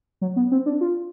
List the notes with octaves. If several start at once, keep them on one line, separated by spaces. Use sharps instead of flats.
F#3
B3
C4
D4
F4